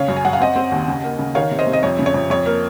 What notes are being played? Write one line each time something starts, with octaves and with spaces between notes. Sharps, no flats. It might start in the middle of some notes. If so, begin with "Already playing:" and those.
Already playing: C#3 C#5 F5
F#2
G#5
F#2 F#5
F5
C4 D#5 F#5
C4
D#2
C#3
A#3
C#3
D#3 C#5 F5
C3
C5 D#5
C3
D#5
F2 C#5
C#3
C#5
F2
F2 C#5
A#3